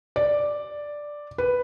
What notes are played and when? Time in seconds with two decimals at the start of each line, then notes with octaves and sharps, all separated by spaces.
0.16 D5
1.38 B4